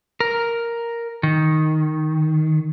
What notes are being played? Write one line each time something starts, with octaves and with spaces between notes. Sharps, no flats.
A#4
D#3